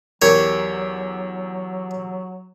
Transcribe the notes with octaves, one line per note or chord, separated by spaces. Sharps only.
E2 F#3 G4 A#4 C#5